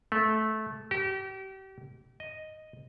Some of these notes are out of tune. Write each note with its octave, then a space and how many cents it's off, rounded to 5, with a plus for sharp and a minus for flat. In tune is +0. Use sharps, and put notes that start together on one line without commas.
A3 -15
G4 -35
D#5 +0